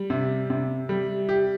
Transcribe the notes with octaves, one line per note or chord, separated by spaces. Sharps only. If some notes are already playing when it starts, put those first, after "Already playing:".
Already playing: G3
C3
C3
G3
G4